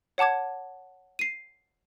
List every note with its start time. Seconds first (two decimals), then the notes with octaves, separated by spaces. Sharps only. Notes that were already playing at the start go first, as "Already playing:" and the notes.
0.18 C#5 F#5 A5 D6 G#6
1.19 C7 D#7